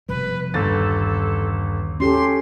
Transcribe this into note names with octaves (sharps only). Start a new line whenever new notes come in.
F1 B2 G3 B4
G1 D#2 C#3 A4 A6
C#4 G4 A4 C6